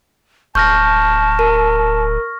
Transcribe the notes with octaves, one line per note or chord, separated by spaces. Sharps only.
D1 A5 C#6 F6 G6 A#6
A#4